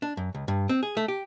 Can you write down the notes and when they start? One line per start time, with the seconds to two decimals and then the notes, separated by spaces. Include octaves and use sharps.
0.02 D4
0.17 F#2
0.35 C#2
0.48 G2
0.69 C4
0.83 G#4
0.97 A3
1.08 G4